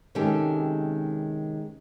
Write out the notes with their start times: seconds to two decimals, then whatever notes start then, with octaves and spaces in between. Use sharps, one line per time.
0.15 C3 D#3 G#3 C#4 G4 A4